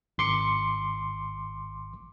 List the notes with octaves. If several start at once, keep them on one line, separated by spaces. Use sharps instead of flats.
G#1 C6 D6 C#7